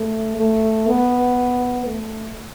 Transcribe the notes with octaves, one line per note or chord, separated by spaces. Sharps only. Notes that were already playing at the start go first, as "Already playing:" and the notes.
Already playing: A3
A3
B3
A3